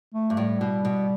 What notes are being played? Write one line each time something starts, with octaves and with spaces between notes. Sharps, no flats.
A3
G2
A2 G3
B2
B2